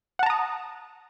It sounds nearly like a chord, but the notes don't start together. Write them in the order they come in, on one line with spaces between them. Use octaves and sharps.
F#5 A5 A#5 D#6